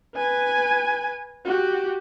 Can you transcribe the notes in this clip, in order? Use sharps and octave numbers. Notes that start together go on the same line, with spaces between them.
B4 G#5
F#4 G4